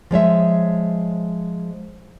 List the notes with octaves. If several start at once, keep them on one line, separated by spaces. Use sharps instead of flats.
F3 G#3 C#5 E5